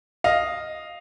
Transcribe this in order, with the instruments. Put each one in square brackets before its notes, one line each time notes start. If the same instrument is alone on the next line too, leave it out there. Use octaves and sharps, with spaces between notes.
[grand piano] D#5 F5